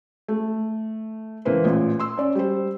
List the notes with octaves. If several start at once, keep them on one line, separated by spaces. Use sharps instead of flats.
A3
C#2 E3 A#3 B4 C5
A1 A#2
C6 E6
C#4 D5
G3 C5